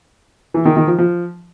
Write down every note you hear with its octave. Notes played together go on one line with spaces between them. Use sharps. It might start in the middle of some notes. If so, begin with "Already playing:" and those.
E3
D#3
D#3
F3
F3